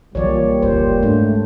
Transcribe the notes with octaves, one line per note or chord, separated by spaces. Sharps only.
B1 A#2 E3 G3 C#5 D5
F1 C#2 G2 C5
G#2 A3 D4